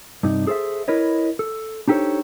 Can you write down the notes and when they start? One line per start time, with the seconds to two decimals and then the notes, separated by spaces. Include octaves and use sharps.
0.23 G2 C3 D#4
0.47 G#4 A4 C5 D5 E5
0.88 E4 A#4 B4 C#5 D#5
1.39 A4
1.88 D4 D#4 G4 A4 C5 C#5